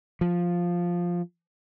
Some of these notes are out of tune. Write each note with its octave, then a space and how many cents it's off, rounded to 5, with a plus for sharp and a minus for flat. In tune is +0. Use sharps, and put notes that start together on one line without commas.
F3 +5